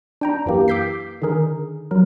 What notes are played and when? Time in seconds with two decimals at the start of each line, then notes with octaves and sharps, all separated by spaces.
0.21 D4 G5 A#5
0.46 F#2 E3 A#3 G4
0.68 D6 E6 G6 B6 C7
1.22 D3 D#3 G#4 A#4
1.91 F#3 A#4